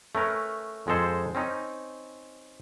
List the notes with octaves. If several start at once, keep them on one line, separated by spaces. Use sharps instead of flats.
A3 C#4 A#4 B4
F2 G#3 G#4 A4 C5
C4 C#4 D#4